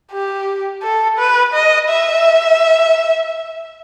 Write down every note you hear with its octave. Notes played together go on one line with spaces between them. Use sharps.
G4
A4
B4
D#5
E5